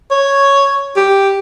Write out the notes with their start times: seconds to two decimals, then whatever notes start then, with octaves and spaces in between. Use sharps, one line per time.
0.11 C#5
0.97 G4